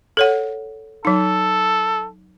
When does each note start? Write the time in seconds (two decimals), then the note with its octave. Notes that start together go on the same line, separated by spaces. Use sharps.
0.17 A4 C#5 F#5
1.05 F#3 D#4 A4